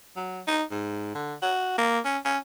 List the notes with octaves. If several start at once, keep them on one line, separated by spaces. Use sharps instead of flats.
F#3
D#4
G#2
D3
F#4
A#3
C#4
C#4